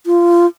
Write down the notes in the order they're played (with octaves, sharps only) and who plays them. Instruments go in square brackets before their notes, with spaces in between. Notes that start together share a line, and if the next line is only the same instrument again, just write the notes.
[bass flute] F4